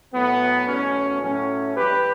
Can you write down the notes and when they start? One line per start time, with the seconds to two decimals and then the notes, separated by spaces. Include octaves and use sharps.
0.12 A2 F#3 A3 B3
0.67 E2 B2 F#3 A3 C#4
1.21 A2 F#3 A3 C#4
1.76 G2 E3 G3 G4 B4